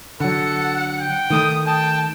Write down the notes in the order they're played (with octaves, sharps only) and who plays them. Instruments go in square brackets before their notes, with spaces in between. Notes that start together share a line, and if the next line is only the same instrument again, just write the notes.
[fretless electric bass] D3 F#3 [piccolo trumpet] A4 [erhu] F#5
[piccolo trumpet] G5
[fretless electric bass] D#3 A3 [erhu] D#6
[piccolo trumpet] G5 [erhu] A5